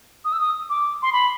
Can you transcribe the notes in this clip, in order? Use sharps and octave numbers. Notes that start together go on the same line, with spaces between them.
D#6
E6
D#6
D6
C6
B5